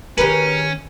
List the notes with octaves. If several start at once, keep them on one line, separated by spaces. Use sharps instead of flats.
D#3 C#4 G4 G#4 A#4 B4